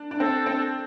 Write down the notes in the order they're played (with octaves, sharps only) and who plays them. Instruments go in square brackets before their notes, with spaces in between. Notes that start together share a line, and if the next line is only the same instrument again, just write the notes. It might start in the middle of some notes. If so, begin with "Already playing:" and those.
Already playing: [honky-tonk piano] D4
D4
[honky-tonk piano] C4 [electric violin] A4
[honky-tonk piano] C4